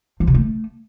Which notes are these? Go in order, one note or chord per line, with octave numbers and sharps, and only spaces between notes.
F3
C3
A3